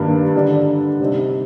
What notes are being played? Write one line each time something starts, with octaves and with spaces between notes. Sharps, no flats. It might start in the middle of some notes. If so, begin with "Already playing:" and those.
Already playing: G2 D#3 G3 A#3 D4
D3 G3 D4
C3 G3 C4 D#4